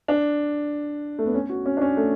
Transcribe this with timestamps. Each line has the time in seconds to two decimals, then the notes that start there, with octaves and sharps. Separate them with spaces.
0.08 D4
1.19 A3
1.26 B3
1.34 C#4
1.49 F#4
1.66 C#4
1.77 D4
1.82 C#4
1.97 A3